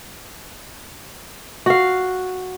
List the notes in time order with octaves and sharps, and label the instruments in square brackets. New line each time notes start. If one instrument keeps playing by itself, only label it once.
[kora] F#4 F5